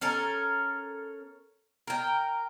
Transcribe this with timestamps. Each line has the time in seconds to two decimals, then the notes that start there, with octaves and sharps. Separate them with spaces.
0.01 C#4 A4 A#4
1.87 A#4 G5